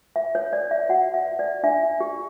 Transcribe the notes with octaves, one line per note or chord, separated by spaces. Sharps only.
C#5 E5
C#5
C#5 D5
E5
F#4 F#5
E5
C#5
D5
D4 E5
G4